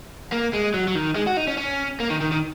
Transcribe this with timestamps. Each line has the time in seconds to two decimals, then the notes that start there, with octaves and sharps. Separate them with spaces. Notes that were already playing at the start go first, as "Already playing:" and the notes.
0.32 A#3
0.53 G#3
0.74 F#3
0.88 F#3
0.95 D#3
1.16 G#3
1.27 F#4
1.37 D#4
1.47 C#4
1.58 C#4
2.00 A#3
2.10 D#3
2.21 D#3
2.32 D#3